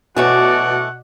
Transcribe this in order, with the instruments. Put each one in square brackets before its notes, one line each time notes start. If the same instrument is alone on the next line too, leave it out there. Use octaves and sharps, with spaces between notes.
[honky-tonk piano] B2 [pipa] E3 A3 C#5 [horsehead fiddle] F#4 D5 [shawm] F#5